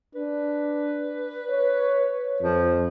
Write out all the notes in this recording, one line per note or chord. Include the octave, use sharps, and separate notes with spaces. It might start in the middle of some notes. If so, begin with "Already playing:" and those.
D4 B4
C#5
F2 F3